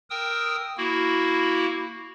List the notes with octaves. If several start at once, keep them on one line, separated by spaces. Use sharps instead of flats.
A#4 G5 D#6 E6
A#3 E4 F#4